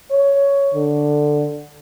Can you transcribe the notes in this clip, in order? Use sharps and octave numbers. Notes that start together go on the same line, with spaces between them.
C#5
D3